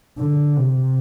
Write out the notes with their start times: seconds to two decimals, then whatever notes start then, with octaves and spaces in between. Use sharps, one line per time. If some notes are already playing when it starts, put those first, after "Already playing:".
0.19 D3
0.56 C3